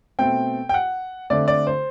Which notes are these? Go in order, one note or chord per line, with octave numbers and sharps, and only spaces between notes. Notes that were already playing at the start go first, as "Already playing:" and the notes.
B2 A3 C4 G5
G5
F#5
D3 A3 C4 D5
D5
C5